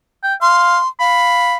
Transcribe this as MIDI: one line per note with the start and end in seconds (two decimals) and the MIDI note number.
0.23 0.34 79
0.42 0.79 77
0.42 0.88 84
1.00 1.57 77
1.00 1.57 83